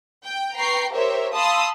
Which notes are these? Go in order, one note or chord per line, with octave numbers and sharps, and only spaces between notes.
G5
B4 G5 A#5 C#6 C7
G4 A#4 C5 C#5 E5
F5 A5 B5 C6 D#6 E6